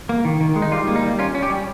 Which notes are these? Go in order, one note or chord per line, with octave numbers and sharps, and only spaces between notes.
A#3
D#3
D#3
G#3
D#4
G3 F4
A#3
D#4
G3
C#4 F4
C#4
G4
G3